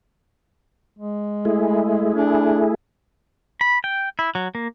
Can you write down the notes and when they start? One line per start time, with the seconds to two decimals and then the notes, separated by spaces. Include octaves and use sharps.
0.99 G#3
1.45 A3 E4 G#4
2.15 D4
3.61 B5
3.84 G5
4.19 E4
4.35 F#3
4.55 A#3